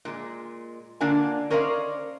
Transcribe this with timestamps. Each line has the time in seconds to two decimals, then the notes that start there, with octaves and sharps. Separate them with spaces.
0.05 A#2 G#3
1.01 D3 A#3 D4 F4 G#5
1.50 C#4 A#4 C5 D5 D#5 F5